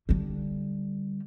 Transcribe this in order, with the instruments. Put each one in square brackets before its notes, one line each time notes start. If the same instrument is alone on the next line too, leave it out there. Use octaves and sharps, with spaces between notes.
[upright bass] D3 G3